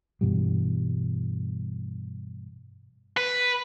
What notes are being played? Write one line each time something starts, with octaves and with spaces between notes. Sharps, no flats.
G2 B2 E3 G3
B4